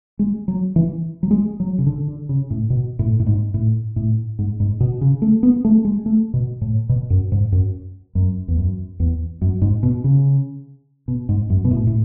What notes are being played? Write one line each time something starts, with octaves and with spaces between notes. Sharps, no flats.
G#3
F#3
E3
F#3
G#3
F#3
C#3
D3
D3
C#3
A2
B2
A2
A2
G#2
A2
A2
G#2
G#2
B2
C#3
A3
B3
A3
G#3
A3
B2
A2
B2
F#2
G#2
F#2
F#2
E2
F#2
E2
F#2
G#2
B2
C#3
B2
G#2
F#2
B2
A2
A2